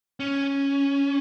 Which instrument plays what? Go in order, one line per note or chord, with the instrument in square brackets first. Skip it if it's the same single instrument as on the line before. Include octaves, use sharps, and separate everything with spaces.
[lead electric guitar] C#4